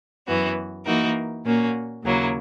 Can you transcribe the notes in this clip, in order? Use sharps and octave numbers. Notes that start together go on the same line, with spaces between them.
F#2 E3 B3 F#4
E3 A#3 D#4 F#4 A#4
A#2 A#3 C#4 F#4
D#2 C#3 F#3 A#3 E4